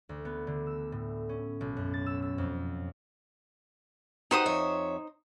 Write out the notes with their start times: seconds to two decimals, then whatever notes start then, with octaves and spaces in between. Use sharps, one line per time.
0.09 D2
0.25 B3
0.47 D3
0.67 E6
0.92 A2
1.29 C#4
1.61 B1
1.77 F#2
1.94 A6
2.06 E6
2.22 E6
2.38 F2
4.31 D#4 F#4 G4 C5 F#5 D#6
4.45 F2 C#5 E5